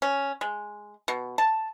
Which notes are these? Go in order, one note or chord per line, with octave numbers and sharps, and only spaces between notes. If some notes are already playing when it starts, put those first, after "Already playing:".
C#4
G#3
B2
A5